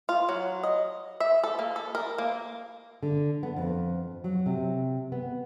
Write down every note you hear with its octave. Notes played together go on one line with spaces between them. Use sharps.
F4
F#3
D#5
E5
A4
A#3
A4
A#4
A#3
D3
B3
F2
F#3
C3
B3